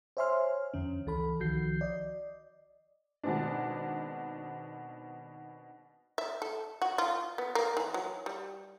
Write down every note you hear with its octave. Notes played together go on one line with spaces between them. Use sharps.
C5 C#5 E5 G#5 C6 F6
F2 D3 C#4
C#2 E3 A4 B5
C2 D#3 F3 F#4 G6 C7
D5 D#5
B2 D#3 G#3 C4 D4
E5
A4
F#4
F4
B3
A#3
E3
F#3
G3